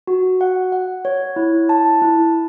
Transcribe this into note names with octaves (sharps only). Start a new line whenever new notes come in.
F#4
F#5
F#5
C#5
E4
A5
E4